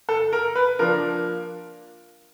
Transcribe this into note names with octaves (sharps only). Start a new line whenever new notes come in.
A4
A#4
B4
F3 A#3 D4 A#4